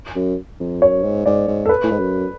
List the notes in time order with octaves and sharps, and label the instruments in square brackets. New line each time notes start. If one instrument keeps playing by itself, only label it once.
[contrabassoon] F#2
F2
[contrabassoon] F#2 [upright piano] C#5
[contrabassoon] G#2
[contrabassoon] G#2 [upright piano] D5
[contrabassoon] G#2
[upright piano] A4
B4
[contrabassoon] A2
G#2
F#2